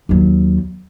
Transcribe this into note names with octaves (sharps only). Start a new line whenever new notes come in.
D#2 F#3